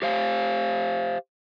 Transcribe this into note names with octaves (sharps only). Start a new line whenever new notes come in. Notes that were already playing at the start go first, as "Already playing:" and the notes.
G4 C5 F5